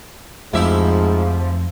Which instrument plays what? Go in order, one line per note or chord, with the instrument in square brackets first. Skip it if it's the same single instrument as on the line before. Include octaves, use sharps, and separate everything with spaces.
[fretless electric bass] F2 A3 [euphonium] G#2 [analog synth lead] F3 [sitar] E4 G4 E5